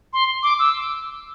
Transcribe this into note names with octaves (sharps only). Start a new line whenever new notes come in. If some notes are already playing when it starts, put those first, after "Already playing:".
C6
D6
E6